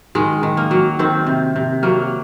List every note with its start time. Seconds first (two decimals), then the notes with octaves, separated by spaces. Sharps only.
0.15 D#3 G#3
0.43 D#3
0.57 A#3
0.71 F#3
0.99 D#3 C4
1.27 C3
1.56 C3
1.83 F#3 A#3